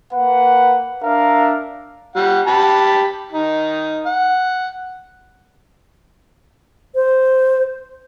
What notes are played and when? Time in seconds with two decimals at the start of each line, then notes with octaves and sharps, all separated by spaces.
0.13 A#3 B4 F#5
1.03 D4 A#4 E5 F5
2.16 G3 F#5
2.47 G4 A5 B5
3.32 D#3 D#4
4.06 F#5
6.95 C5